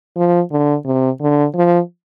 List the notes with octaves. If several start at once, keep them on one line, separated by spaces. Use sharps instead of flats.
F3
D3
C3
D3
F3